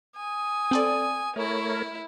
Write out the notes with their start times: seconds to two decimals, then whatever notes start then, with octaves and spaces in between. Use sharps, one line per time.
0.16 G#5 D#6
0.71 C4 A4 D5
1.36 A3 E4 A#4 C#5